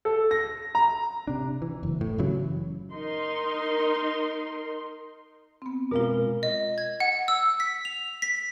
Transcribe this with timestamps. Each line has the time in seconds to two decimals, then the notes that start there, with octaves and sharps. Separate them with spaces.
0.05 A4
0.31 A#6
0.75 A#5
1.27 C3 D4
1.62 E3
1.83 F#1
2.01 A2
2.18 F#1 C#3 E3 F#3
2.93 D#4 A#4 C6
5.62 B3 C4
5.91 B2 G#3 F4 A#4 F5
6.43 D#5
6.78 G#6
7.00 F#5
7.28 E6
7.60 B6
7.85 F7
8.22 B6